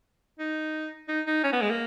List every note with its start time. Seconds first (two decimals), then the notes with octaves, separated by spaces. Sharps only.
0.39 D#4
1.08 D#4
1.27 D#4
1.44 C#4
1.53 B3
1.62 G#3
1.70 A#3